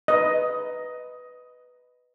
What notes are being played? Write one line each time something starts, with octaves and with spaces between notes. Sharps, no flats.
B4 D#5